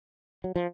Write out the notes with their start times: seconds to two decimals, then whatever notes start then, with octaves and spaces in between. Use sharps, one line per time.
0.44 F#3
0.56 F3